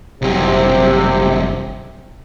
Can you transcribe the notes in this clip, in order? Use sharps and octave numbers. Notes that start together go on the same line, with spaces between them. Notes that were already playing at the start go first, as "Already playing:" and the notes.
G1 C2 F#2 C3